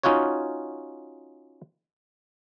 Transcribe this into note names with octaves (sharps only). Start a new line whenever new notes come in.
C#4 D#4 F4 F#4 C#5